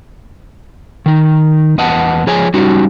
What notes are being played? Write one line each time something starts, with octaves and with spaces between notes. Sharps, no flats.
D#3 D#4
E2 B3 D#5 F#5 A5
F3 G#4 C#5 D#5 G#5
G3 C#4 D#4 F#4 G4